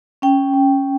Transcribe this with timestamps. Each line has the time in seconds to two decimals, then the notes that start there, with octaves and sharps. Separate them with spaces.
0.22 C#4 G5
0.54 C#4